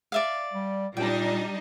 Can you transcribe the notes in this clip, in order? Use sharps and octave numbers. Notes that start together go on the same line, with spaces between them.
D5 E5 F5
G3
A#2 G3 D4 D#4 G5